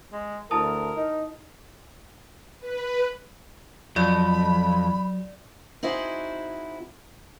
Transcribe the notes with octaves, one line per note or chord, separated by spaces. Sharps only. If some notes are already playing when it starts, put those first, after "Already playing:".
G#3
D2 E4 A#4 A5 D#6
D#4
B4
F2 F#3 D5 B5
C4 D#4 E4 F#4 G#4 C5